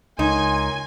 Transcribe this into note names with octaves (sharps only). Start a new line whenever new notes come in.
C#2 D#4 A#4 C#5 G#5 C6